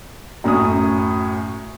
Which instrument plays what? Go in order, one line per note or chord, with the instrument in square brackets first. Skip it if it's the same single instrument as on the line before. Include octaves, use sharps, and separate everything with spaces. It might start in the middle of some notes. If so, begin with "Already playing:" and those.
[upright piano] F#2 A2 C#4 G#5 D#6